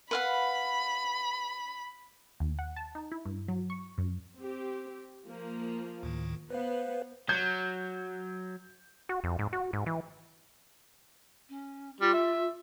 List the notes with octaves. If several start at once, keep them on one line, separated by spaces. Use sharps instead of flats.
B4 F5 F#5 B5
D#2
F#5
A5
D#4
E4
G2
F#3
C#6
F#2
C4 G4
F3 A#3
D2 A2 D#3
B3 B4 C5 F5
F#3 G6
F#4
F2
G#2
F#4
G#2
E3
C#4
G3 F4
E5